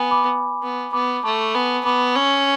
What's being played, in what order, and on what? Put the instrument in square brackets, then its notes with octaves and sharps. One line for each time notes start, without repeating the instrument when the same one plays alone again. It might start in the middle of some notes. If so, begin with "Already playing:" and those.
Already playing: [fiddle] B3 [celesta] G#5 B5
[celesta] B5 D6
[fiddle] B3
[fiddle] B3 [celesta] B5 D6
[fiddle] A3 [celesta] A5 C#6
[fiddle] B3 [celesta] G#5 B5
[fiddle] B3 [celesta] B5 D6
[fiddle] C#4 [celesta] C#6 E6